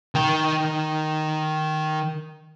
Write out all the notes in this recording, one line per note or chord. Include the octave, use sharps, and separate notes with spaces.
D#3 G5